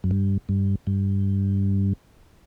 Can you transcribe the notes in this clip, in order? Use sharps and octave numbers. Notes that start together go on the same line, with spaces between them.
F#2
G2
G2
G2